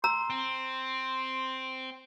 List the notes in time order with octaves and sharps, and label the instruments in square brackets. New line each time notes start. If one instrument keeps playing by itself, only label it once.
[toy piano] A#5 E6 [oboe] C6
[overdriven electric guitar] C4